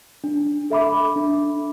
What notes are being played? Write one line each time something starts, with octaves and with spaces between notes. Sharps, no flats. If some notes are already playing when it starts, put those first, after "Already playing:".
D4
A4 E5 B5 D6
D4